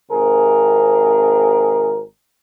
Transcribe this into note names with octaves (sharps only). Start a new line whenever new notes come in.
G#1 C3 G#4 A#4